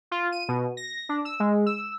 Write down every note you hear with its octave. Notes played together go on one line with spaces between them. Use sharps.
F4
D#7
B2
A#6
D4
E6
G#3
E6